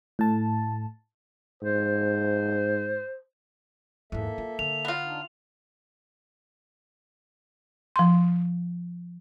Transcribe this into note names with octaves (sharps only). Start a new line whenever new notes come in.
A2 A5
G#2 C5
E2 G#2 A#3 A4 E5
F4
D3 F7
B3 F4
D4 D#4
F3 C6